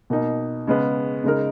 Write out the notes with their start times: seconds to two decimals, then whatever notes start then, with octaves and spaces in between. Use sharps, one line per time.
0.10 B2 A#3 D#4
0.67 C#3 G#3 B3
1.24 C#3 G#3 D#4 A#4